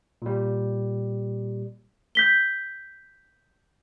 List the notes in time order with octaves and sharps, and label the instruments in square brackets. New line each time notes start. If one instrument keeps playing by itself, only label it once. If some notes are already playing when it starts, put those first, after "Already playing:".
[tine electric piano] A#2 G3
[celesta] G6 B6 G7